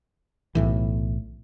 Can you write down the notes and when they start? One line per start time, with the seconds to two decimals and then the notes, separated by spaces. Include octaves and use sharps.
0.55 B1 A2 E3